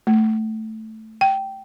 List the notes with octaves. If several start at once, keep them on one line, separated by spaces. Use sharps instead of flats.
A3
G5